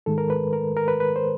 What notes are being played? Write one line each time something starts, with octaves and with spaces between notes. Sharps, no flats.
G#2 D#3 G#3 A4
A#4
B4
A#4
A#4
B4
B4
C5